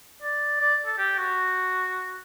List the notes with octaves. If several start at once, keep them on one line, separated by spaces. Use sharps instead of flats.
D5
D5
A4
G4
F#4